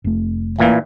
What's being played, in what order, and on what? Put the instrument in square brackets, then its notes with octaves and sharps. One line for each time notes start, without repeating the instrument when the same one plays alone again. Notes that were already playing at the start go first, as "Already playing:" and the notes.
[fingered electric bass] F1 A3
[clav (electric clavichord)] A1 A#2 E3 [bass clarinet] A#3